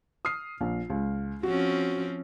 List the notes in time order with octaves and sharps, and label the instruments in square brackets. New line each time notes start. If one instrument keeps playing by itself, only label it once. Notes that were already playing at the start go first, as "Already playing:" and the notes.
[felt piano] D#6 F6 C7
A#1
C#2
[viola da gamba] F3 C4 C#4 [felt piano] F#4